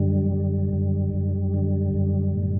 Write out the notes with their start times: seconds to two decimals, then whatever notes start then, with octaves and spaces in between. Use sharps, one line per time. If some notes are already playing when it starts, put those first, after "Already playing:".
Already playing: F#2 D3 G3
0.32 D3
0.73 F#2
1.13 F#2
1.54 D3
1.94 F#2
2.35 A2